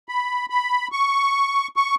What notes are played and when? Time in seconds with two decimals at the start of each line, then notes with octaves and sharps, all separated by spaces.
0.09 B5
0.50 B5
0.92 C#6
1.76 C#6